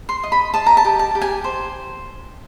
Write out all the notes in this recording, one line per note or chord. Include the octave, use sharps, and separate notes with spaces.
C6
D#5
B5
D#5 A5
A#5
A5
G4
A5
G4
G#5
C5